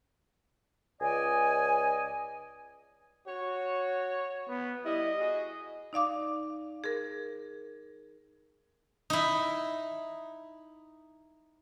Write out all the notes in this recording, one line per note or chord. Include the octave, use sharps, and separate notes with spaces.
C#2 D5 D#5 G#5
F#4 C#5
B3
G3 E4 D#5
F#4 G#4
D#4 D5 F5 D6
G#4 A#4
D#4 E4